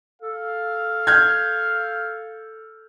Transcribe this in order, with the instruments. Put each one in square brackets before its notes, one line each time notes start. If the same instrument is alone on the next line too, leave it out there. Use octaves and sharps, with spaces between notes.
[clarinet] A4 [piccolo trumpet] F5
[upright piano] F6 G6 G#6